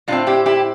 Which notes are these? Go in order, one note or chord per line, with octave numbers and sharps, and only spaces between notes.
A2 G3 C4 D4 F4
E4 G4
E4 G4